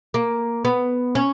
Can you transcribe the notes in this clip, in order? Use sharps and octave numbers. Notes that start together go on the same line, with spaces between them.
A#3
B3
C#4